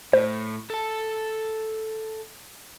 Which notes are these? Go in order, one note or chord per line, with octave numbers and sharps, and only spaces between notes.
A2 C5
A4 A5